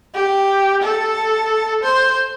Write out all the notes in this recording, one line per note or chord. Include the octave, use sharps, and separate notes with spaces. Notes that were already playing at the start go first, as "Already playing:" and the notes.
G4
A4
C5